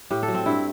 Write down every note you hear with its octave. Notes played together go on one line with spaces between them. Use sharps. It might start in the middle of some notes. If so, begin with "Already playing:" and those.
A2 G4
A4
F#3
C4
G2 E4